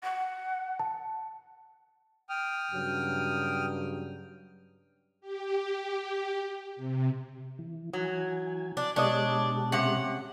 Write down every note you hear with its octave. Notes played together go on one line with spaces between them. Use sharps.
F#5
A5
G5 D#6 F6
G2 C#3 F#3
G4
C3
E3
E3 F#3 G#5
D4
B2 G#3 D4 G4 C#5 D#5
C3 C#4 F#5